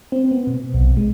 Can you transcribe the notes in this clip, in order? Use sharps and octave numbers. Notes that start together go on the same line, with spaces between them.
C4
B3
B2
B1
G#3